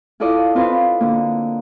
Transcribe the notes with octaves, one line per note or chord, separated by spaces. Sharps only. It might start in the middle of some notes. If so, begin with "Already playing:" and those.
E4 F4 A4 D5 D#5
C4 F4 B4 C5
D3 A#3